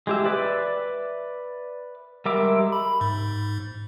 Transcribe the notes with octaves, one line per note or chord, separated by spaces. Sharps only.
G#3 G4 E5
B4 D5 E5 D6
G3 G#3 A#4 E5 D6
B5
G#2